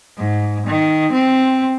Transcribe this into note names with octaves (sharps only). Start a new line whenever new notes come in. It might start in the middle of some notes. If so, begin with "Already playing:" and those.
G#2
D#3
C4